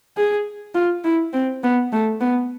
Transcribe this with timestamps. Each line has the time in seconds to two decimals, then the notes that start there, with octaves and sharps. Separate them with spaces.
0.17 G#4
0.75 F4
1.04 E4
1.33 C4
1.63 B3
1.93 A3
2.21 B3